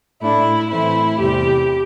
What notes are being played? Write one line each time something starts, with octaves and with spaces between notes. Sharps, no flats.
A2 A3 D4 E4
A2 E3 A3 C4 E4
E2 C3 G3 C4 G4